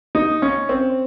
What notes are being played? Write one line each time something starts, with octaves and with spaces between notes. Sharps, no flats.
D#4
C#4
C4